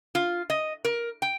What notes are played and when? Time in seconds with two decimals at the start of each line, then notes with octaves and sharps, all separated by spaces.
0.15 F4
0.50 D#5
0.85 A#4
1.22 G5